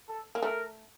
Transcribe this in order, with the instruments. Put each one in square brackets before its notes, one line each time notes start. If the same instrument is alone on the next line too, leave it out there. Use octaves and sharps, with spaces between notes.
[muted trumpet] A4
[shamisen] A#3
[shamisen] A3 [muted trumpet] A#4